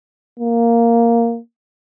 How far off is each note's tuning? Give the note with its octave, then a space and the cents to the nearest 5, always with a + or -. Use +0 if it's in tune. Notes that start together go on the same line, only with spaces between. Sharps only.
A#3 -5